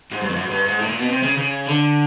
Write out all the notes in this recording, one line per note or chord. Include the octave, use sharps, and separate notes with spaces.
G#2
G2
F2
F#2
G#2
G2
G#2
A2
A#2
B2
C3
C#3
C#3
D3